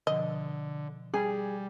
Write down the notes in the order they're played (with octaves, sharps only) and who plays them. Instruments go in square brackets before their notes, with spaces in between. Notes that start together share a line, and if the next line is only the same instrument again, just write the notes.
[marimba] B2 F3 [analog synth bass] D3 [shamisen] D#5
[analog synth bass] G3 [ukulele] G#4 [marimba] G5 G#5